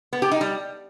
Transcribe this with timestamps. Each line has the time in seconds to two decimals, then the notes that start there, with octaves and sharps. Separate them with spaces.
0.13 B3
0.22 G4
0.31 D#4
0.41 G3